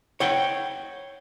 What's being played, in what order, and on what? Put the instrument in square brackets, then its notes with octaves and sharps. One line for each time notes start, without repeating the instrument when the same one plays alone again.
[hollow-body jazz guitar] C#5 F#5 G5